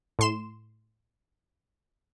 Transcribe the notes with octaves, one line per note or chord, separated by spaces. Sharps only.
A2 C6 E7